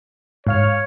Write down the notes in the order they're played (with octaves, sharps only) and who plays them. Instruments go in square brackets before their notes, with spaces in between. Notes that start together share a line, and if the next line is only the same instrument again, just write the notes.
[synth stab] G#2 F5 F6 [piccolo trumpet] C#5